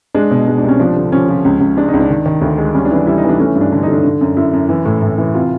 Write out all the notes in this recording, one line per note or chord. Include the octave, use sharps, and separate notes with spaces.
G#3 D4
B2
G#3 D4
C2 D4
C#4
F3 D4
D3
F3 C#4
F3
C#2
C#2
G#3 D4
D#4
C#2
D4
D#3
D#3
D2
G#3
G3 C#4
D4
E3
D4
G3 E4
D#4
E3
D4
A3 C#4
G2
D4
D3 D4
D3 D#4
D4
D3
F#2
F#2 E4
F#2
E3
A2
A2
E3
C3 F4